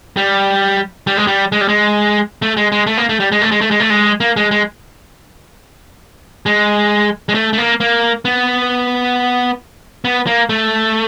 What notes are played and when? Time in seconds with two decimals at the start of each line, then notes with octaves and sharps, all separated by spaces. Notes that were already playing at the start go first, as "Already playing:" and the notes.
0.17 G3
1.07 G3
1.17 G#3
1.27 G3
1.52 G#3
1.61 G3
1.68 G#3
2.42 A3
2.57 G#3
2.72 G#3
2.87 A3
2.98 A#3
3.09 A3
3.20 G3
3.32 G#3
3.42 A3
3.51 G#3
3.61 A3
3.71 G#3
3.80 A3
3.90 G#3
4.20 A#3
4.36 G#3
4.51 G#3
6.46 G#3
7.29 G#3
7.35 A3
7.53 A3
7.58 A#3
7.80 A#3
8.25 B3
10.05 B3
10.27 A#3
10.49 A3